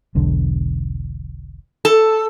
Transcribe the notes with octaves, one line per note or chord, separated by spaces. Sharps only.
E1 B1 D3
A4